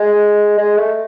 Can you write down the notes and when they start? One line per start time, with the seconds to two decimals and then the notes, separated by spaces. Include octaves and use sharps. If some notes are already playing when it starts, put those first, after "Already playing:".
Already playing: G#3
0.58 G#3
0.77 A3